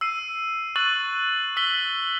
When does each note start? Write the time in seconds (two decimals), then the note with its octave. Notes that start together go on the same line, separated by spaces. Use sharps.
0.01 E6 C7 D#7
0.76 C#6 E6 F#6 A6 D#7 F#7
1.57 E6 B6 F#7 G7